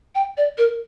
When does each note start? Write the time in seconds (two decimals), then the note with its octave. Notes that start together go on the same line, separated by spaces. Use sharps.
0.15 G5
0.37 D5
0.58 A#4